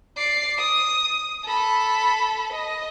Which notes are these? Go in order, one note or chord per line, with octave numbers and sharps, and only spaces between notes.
D5 C7
D#6
A4 B5
D#5